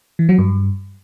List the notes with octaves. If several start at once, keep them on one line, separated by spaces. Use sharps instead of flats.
E3
F#3
G2